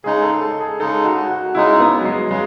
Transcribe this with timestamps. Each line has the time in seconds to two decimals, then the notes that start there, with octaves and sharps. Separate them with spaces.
0.04 C#3 G#3 D#4 G#4
0.23 A4
0.42 A4
0.61 G#4
0.80 C#3 G#3 D#4 A4
1.04 F#4
1.31 F#4
1.55 C#3 G#3 D#4 E4
1.80 B3
2.00 F#3
2.05 G#3
2.30 C#3 G#3